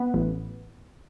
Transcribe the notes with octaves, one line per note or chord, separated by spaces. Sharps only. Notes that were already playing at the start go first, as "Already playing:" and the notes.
Already playing: B3 B4
A1